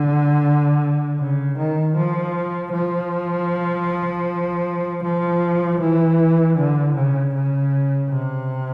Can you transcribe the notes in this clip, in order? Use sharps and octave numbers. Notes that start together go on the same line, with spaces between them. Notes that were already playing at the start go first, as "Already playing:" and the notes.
Already playing: D3
C#3
D#3
F3
F3
F3
E3
D3
C#3
C#3
C3